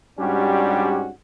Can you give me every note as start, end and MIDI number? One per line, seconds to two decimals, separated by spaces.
0.19 1.10 44
0.19 1.10 55
0.19 1.10 61
0.19 1.10 62
0.19 1.10 66
0.19 1.10 67